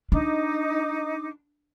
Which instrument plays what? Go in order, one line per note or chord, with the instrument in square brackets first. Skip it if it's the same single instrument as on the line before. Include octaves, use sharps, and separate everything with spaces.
[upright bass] D4 [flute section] D#4 D6